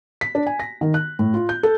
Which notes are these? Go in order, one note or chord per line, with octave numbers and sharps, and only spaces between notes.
B6
D4
G#5
A#6
D#3
F#6
A2
F4
G6
A4